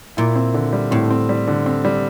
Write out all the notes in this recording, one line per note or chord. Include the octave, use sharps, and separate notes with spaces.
A#2 E4
C4
D3
G3
A2 C4
C4
G3
D3
C4
G3